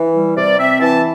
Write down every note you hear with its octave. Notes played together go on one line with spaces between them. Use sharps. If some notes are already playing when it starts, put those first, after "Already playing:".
Already playing: E3
G3
C3 D5
C4 E5
E3 A5